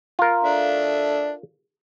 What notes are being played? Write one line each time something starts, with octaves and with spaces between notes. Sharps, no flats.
F4 A#4
D4 A4 E5